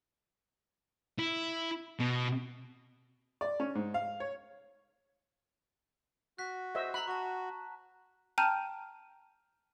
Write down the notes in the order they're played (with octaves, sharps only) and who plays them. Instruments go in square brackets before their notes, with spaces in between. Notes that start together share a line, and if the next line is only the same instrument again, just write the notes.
[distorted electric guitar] E4
B2
[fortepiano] D5
C#4
G#2
F5
C#5
[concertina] F#4 [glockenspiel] F#6 B6
[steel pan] C5 D#5 E5
[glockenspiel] A#5 F#6 [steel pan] B5
[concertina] F#4 [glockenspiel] A5 C#6
[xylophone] G5 A5 A#5 F6 G6 D#7